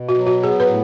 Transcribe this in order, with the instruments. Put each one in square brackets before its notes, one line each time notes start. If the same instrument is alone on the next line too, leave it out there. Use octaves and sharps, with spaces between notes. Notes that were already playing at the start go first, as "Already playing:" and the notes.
Already playing: [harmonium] B2
[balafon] F#4
[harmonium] F#3
[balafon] F#4
[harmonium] B3 [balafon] G#4
[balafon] B4
[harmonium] A2